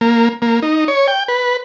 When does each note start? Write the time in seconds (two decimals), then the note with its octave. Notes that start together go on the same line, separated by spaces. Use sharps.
0.01 A#3
0.42 A#3
0.63 D#4
0.88 C#5
1.08 G5
1.28 B4